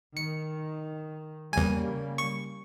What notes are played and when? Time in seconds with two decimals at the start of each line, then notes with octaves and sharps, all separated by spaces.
0.17 D#3 C#7
1.53 E2 C#3 G3 A#3 G#5
2.18 C#6